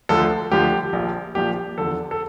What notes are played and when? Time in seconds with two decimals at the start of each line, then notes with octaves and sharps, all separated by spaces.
0.09 D2 D3 F3 A4
0.51 D2 D3 F3 G4
0.93 A#1 A#2 F3
1.35 A#1 A#2 F3 G4
1.78 E2 D3 F3 A4
2.11 A4